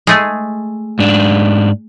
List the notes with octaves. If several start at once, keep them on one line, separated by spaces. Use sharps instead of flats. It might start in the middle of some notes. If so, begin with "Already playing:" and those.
G#3 A3 G#4
G#2 D4